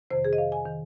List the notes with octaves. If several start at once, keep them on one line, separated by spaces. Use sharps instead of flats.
F2 C3 D#3 C5
G#4
D#5
F5
G#5
D#3